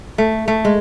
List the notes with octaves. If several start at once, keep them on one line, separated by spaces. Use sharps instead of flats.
A3
A3
G#3